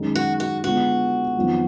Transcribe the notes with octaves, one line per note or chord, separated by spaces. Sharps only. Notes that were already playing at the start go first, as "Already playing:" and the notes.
Already playing: F#2 D#3 G#3
F#4
F#4
D3 G#3 B3 F4 F#4
F2 D#3 F#3 B3